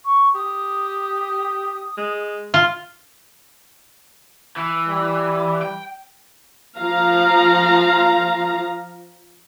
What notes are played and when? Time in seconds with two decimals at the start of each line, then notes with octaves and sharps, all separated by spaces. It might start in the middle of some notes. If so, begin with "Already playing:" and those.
0.04 C#6
0.34 G4 D#6
1.98 G#3
2.54 F4 C6
4.56 E3
4.88 G3
5.62 G5
6.78 F3 F5 A#5